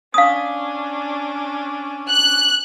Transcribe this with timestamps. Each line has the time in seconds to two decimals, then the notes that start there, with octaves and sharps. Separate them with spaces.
0.14 C#4 D4 F5 D#6
2.09 F#6